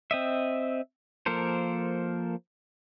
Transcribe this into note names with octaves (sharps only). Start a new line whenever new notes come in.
C4 D#5 E5
F3 A#3 A4 A#4 C5